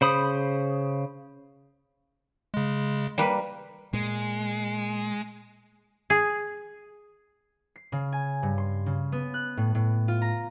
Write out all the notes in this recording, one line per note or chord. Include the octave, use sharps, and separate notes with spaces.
C#3 C5 B5 D#6
C#3 G#3
G3 A#3 B4
A#2 G#3
G#4
C7
C#3
G#5
G2
C6
C#3
B3
F#6
A2
A2
F4
A#5